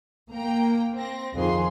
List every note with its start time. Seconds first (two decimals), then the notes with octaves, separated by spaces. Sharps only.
0.32 A#3 G5 A#5
0.94 C4 A#6
1.34 F2 D#3 F4 G#4 C6